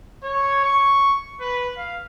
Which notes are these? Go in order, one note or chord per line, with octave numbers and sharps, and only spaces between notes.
C#5
C#6
B4
F5